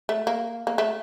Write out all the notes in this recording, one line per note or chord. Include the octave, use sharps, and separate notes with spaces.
A3
A#3
A#3
A3